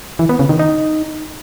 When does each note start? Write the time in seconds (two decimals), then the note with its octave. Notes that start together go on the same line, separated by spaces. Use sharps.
0.19 E3
0.29 B3
0.39 C#3
0.49 D#3
0.59 D#4